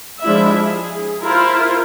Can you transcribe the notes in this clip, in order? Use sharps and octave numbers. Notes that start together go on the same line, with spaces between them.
F3 G#3 D4 E4 E5
G#4
E4 F4 A#4 C5